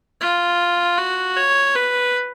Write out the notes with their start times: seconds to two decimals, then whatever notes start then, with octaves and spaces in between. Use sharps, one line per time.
0.21 F4
0.98 F#4
1.37 C#5
1.75 B4